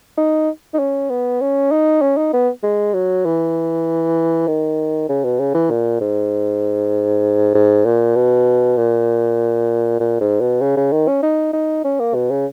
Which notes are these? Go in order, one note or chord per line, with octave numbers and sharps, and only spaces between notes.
D#4
D#4
C#4
B3
C#4
D#4
C#4
D#4
B3
G#3
F#3
E3
D#3
C#3
B2
C#3
E3
A#2
G#2
G#2
A#2
B2
A#2
A#2
G#2
B2
C#3
C#3
D#3
C#4
D#4
D#4
C#4
A#3
B2
C#3